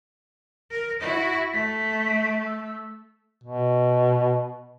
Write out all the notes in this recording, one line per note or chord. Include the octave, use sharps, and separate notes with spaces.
A#4
E4 F#4
A3 B6
E6
B2